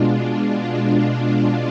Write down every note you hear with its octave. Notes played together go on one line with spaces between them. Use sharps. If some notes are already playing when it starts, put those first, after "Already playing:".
Already playing: B2 G#3 D4 F4
D4
D4